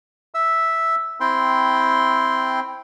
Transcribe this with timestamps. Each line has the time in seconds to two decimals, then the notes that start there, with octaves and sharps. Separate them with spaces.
0.34 E5 E6
1.20 C4 E4 G5 C6